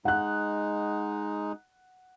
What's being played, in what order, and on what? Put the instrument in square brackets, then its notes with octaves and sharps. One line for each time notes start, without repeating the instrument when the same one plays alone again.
[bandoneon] G#3 D#4 [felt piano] F#5 F#6